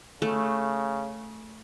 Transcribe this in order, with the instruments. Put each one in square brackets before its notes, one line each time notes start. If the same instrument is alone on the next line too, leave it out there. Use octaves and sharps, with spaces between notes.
[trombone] C#3 [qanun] A3